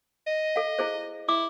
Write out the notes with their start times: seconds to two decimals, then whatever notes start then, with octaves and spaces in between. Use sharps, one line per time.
0.27 D#5
0.56 A4 F5
0.79 E4 G#4 C5
1.29 E4 D6